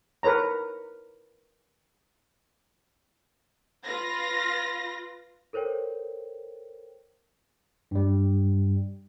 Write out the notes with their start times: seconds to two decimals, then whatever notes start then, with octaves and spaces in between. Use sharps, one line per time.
0.23 A#4 B4 C#5 A#5
3.84 F4 B4 A#6
5.53 A4 A#4 C5 C#5 G5
7.91 G2 G3